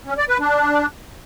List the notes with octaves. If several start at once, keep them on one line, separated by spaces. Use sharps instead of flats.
C#4
D5
B4
D4